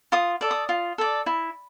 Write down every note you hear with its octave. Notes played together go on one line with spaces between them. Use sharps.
F4 D#6
A4 D5
D#6
F4
A4 D5
E4